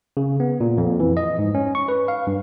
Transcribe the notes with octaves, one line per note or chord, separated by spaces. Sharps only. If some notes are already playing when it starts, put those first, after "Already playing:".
C#3
B3
A#2
F2
E3
D#5
G#2
C#4
C#6
B4
F5
G2